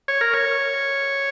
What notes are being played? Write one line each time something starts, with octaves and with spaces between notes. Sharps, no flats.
C#5
A#4
C#5